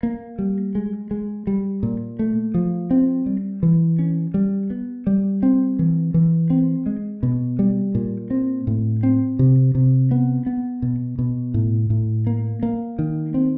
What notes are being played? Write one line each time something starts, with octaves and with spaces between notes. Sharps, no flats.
A#3
G3
G#3
G#3
G3
A#2
A3
F3
C4
G3
E3
C#4
G3
B3
G3
C4
E3
E3
C4
G#3
B2
G3
A#2
C4
A2
C4
C3
C3
B3
B3
B2
B2
A2
A2
A#3
A#3
D#3
C4